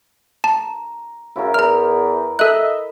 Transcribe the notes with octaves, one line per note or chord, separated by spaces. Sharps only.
A5 A#5
F#2 C#3 E4 A#4
E2 A#5 F6
A4 D#5 E5 F#6